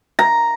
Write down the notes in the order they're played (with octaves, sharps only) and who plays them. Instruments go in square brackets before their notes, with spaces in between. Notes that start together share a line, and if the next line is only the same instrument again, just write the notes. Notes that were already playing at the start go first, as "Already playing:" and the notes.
[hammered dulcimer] A#5